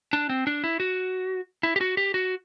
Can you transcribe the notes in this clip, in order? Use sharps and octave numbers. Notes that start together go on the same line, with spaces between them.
D4
C4
D4
E4
F#4
E4
G4
F#4
G4
F#4